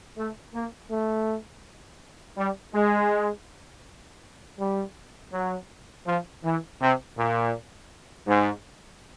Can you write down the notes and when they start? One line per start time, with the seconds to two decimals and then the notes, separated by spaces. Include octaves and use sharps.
0.17 A3
0.54 A#3
0.91 A3
2.38 G3
2.75 G#3
4.60 G3
5.33 F#3
6.06 F3
6.44 E3
6.81 C3
7.18 A#2
8.28 G#2